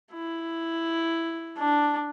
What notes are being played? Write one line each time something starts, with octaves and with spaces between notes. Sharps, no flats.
E4
D4